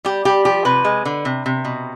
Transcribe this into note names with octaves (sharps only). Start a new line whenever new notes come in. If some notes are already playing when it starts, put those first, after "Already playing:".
G3 G4
G3 G4
F3 G4
C3 B4
G#3
D3
C3
C3
B2